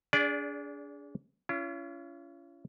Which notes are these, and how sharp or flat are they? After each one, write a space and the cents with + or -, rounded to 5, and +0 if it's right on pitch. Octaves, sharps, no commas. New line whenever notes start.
D4 -30 G#4 +0 D5 -5
C#4 +25 F4 -45